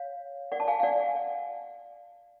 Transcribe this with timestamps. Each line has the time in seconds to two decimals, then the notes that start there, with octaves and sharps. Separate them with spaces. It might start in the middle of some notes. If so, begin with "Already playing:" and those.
Already playing: C#5 F5
0.52 D5 F#5
0.60 A5
0.68 F5 G#5
0.80 F5
0.83 D5 F#5